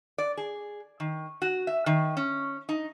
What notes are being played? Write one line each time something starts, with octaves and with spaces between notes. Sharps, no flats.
D5
G#4
D#3
F#4
E5
D#3
C#4
D#4